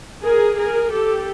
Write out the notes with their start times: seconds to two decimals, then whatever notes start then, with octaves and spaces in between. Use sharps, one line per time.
0.23 G#4 A#4
0.58 G#4 A#4
0.92 G4 A4